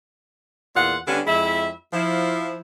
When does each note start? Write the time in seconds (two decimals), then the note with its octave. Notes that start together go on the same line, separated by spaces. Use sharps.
0.75 E2 A#2 F4 F#5
1.07 D3 G3 B3 C#4 D4
1.26 F2 G#3 E4 E5
1.93 F3 E4